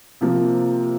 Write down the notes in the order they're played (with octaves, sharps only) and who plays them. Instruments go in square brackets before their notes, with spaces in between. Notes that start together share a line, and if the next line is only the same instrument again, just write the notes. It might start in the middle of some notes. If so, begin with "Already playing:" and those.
[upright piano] C3 F3 A#3